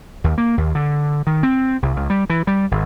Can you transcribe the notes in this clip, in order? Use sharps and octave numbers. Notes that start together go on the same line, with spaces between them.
D#2
A#3
D#2
D3
D#3
C4
C2
C#2
G3
E3
G3
G#1